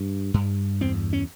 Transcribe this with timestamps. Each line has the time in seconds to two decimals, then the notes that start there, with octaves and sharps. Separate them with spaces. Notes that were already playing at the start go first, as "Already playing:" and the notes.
Already playing: G2
0.34 G2
0.81 E2 C4
1.13 C#4